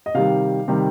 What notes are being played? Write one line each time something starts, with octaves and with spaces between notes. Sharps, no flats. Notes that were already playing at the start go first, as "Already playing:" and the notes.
D#5
C3 D#3 G3 F5
C3 D#3 G3